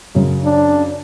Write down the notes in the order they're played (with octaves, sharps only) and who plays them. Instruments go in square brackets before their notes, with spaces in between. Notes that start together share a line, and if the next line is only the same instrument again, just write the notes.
[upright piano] F#2 C#3
[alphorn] D4